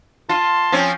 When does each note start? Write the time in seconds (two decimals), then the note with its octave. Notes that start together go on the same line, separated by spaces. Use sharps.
0.29 F4 A5 C6
0.72 F3 C4 C#4